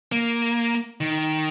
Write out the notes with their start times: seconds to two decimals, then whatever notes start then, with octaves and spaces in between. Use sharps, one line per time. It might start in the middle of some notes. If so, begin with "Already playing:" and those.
0.12 A#3
1.01 D#3